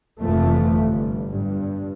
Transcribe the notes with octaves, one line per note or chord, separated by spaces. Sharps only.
F1 F2 E3 F3 A3
G1
G2